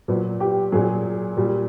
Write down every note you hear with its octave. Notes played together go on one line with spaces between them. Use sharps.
A#2 F#3 B4
G4
A#2 F#3 G#4
A#2 G3